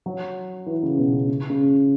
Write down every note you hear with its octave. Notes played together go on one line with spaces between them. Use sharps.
F#3
E3
C#3
B2
C#3
C#3
C#3